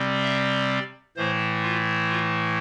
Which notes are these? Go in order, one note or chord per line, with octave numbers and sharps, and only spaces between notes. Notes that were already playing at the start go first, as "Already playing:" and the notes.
Already playing: C3 G3 C4
E5
D5
A2 E3 A3 C5
F4
F4